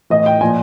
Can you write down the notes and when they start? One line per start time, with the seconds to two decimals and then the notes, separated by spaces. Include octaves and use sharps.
0.10 A2 E3 D#5
0.26 G5
0.41 A#2 F3 G#5